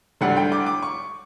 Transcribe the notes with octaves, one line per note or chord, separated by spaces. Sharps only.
D2 D3 G3 F#5
G5
D6
D6
C#6